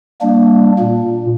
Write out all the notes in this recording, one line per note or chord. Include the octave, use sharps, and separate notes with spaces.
G3 A#3 D4
A#2